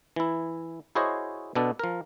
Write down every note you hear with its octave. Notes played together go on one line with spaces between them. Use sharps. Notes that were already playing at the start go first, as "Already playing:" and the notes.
E3 E4
E4 F#4 G#4 C5 C#5 D#5
B2 B3 D4 A4
F3 A#4